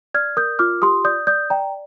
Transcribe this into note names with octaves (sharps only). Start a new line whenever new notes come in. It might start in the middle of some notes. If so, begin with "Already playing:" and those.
D5 F6 G#6
A#4 D#6 G6
F4 D6 F6
G4 C6 D#6
D5 D#6 G6
D5 D#6 G6
D5 G5 A#5